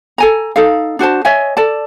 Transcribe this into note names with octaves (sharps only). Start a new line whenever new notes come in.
A4 G#5 A#5
D#4 A4 F5
D4 F#4 C5 A5
C#5 D#5 E5 G#5
A4 D5 A5